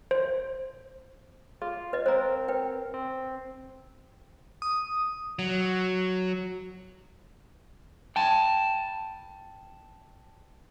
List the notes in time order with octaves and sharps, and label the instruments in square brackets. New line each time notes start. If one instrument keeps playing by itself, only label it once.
[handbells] C5
[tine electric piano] F4 [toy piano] G#4
[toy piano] B4 D#5
[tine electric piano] C4 A#4 [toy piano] C5 A#5
[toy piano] B4 G5
[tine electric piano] C4
[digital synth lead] D#6
[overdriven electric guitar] F#3
[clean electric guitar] G5 A5